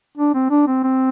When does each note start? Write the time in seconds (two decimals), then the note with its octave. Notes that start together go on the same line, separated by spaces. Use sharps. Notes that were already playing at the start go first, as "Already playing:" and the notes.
0.18 D4
0.34 C4
0.51 D4
0.67 C4
0.84 C4